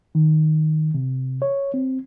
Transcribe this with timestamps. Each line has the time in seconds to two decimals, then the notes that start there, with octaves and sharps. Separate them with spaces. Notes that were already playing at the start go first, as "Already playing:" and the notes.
0.15 D#3
0.94 C3
1.42 C#5
1.74 C4